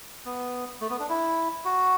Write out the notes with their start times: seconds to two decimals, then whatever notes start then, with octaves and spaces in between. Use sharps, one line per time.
0.25 B3
0.81 A3
0.90 B3
1.00 D4
1.09 E4
1.65 F#4